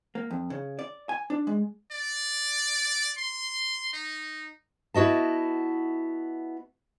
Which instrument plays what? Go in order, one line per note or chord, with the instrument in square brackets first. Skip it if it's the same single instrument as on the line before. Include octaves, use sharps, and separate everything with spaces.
[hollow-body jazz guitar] A#3
F2
C#3
D5
G#5
D4
G#3
[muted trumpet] D5
C6
D#4
[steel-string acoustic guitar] B3 E4 F#4 D#5 A5